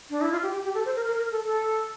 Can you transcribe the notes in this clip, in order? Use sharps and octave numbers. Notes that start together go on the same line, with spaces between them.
D4
E4
F4
G4
G4
G4
A4
C5
A#4
A#4
A#4
A4
A4